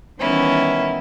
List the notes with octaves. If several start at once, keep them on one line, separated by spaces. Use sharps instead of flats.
D#3 E3 G3 B3 C#4 E4